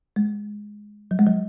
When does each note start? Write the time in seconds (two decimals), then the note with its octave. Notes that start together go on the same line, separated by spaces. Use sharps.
0.16 G#3
1.11 F#3
1.19 G#3
1.27 F#3